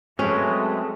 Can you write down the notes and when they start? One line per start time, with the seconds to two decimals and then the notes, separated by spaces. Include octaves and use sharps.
0.19 F#3 G#3 A3 C4 C#4 B4